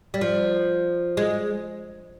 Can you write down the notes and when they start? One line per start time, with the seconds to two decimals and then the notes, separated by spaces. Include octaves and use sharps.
0.14 G3
0.21 F3
1.17 G#3